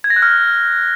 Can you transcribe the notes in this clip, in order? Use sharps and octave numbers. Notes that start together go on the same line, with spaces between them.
G#6
A#6
F#6
F6